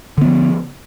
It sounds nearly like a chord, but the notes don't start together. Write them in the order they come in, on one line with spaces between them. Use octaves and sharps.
D3 B3 F3